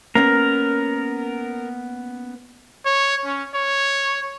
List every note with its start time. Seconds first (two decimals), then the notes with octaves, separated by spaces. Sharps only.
0.15 A#3 B3 C#4 A#4
2.86 C#5
3.25 C#4
3.54 C#5